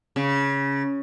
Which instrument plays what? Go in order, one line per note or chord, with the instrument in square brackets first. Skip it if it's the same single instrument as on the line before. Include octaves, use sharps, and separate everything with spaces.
[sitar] C#3